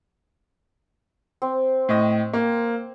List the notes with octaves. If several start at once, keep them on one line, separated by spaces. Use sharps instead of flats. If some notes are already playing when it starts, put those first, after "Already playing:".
C4
A2 D#5
A#3